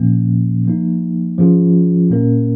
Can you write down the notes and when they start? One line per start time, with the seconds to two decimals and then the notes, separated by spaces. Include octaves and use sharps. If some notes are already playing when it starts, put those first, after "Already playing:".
Already playing: A#2 F3 A#3 C#4
0.66 F3 A#3 D#4
1.38 G#2 F3 C#4 F4 G#4
2.10 A#2 A#3 C#4 A#4